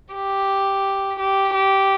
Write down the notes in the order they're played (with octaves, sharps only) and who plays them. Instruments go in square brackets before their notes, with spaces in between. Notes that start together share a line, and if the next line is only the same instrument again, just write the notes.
[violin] G4
G4
G4